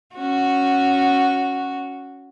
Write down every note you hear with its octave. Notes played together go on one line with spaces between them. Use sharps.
C#4 F#4